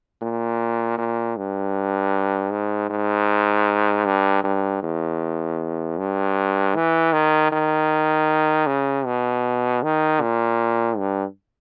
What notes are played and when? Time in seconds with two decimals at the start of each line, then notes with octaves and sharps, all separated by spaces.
0.22 A#2
0.98 A#2
1.37 G2
2.52 G#2
2.90 G#2
4.05 G2
4.44 G2
4.83 E2
5.98 G2
6.75 E3
7.13 D#3
7.52 D#3
8.67 C#3
9.06 B2
9.83 D#3
10.21 A#2
10.98 G2